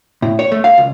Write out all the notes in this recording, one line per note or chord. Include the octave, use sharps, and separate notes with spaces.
A2
C#5
A3
F5
C#2